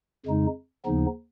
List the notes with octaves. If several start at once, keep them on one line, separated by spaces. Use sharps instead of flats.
F2 C#3 G#3 D#4
D#2 C#3 F3 B3 D#4